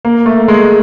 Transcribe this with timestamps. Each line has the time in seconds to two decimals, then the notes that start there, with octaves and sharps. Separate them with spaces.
0.05 A#3
0.26 A3
0.48 G#3